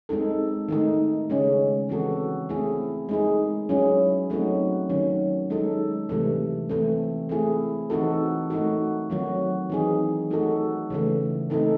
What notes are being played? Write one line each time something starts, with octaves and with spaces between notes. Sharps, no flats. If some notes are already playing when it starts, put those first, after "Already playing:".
G#3 C4 D#4 A4
D#3 A3 D#4
C#3 G#3 C#4 G#4
E3 C4 F#4 A4
A3 C4 E4 G#4
G#3 D#4 G#4
F#3 C#4 E4 G#4
F#3 A3 C4 D#4 F#4
D#3 F#3 C#4
G#3 D#4 A4
C3 E3 A3
E3 A3 C4
A3 C4 E4 G#4
E3 C4 D#4 F#4 A4
A3 D#4 F#4
D#3 F#3 C4 F#4
E3 C4 D#4 G#4
A3 D#4 F#4 A4
C#3 E3 A3
A3 C4 D#4 A4